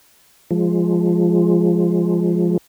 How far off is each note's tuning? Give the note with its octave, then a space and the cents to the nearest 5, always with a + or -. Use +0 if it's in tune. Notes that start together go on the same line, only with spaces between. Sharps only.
F3 +0 G#3 +0